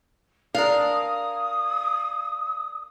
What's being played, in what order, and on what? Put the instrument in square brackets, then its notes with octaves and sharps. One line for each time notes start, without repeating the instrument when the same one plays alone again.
[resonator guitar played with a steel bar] D4 A#4 [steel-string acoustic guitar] F5 [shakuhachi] D#6